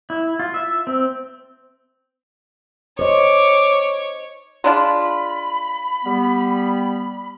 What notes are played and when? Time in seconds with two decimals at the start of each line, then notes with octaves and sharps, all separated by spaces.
0.10 E4
0.39 F4
0.54 E5
0.87 C4
2.99 C5 C#5 D#5 D6
4.64 G#3 D4 F4 B5
6.04 G3 B3